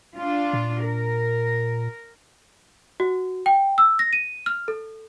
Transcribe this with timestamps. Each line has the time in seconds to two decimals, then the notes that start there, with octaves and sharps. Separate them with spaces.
0.17 D4 F4
0.53 A#2
0.84 A#4
3.00 F#4
3.46 G5
3.78 E6
3.99 A#6
4.13 D#7
4.46 F6
4.68 A4